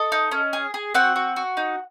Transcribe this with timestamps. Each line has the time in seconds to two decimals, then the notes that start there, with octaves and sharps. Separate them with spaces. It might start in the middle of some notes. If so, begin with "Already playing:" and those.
Already playing: A4 D#5
0.12 D#4
0.31 C#4
0.53 G#4
0.74 G#4
0.94 C4 F#4 F#5
1.16 F#4
1.36 F#4
1.57 D#4